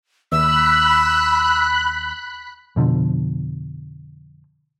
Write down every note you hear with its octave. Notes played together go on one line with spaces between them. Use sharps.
D#2 B5 E6 F#6
F2 B2 D3 F3